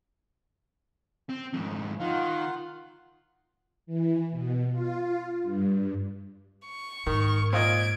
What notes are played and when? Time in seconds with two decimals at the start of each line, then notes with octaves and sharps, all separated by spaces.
1.30 C4
1.54 F2 G#2
2.00 D#3 F4 F5 F#5
3.87 E3
4.31 B2
4.72 F4
5.43 G2
6.67 C#6
7.07 G#2 D#3
7.53 A#2 C4 F4 D#5 G#6 D7